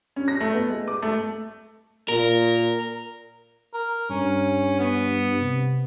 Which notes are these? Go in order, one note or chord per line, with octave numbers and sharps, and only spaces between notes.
C#4
A#6
A3
B3
G#3
D6
A3
A#2 A#4
A#4
G2 C#4
B3
C3